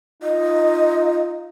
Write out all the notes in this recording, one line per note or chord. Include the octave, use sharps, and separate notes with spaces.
D#4 F4 D#5